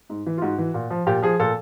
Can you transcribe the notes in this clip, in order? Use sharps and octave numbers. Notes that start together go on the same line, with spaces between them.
G#2
E3
F4
G#2 F#4
E3
A#2
F3
A#2 G4
F3 G#4
A#2 A4